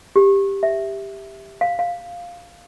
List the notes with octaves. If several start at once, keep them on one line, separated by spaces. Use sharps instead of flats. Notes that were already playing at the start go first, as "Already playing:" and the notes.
G4
E5
F5
F5